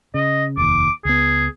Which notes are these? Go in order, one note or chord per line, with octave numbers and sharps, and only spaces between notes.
C#3 D#5
F1 D#2 D6
C#2 B3 G#4